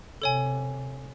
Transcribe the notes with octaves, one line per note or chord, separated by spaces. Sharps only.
C3 A4 C#5 G#5